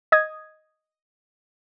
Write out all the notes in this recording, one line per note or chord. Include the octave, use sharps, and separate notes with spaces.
D#5 D#6 G#6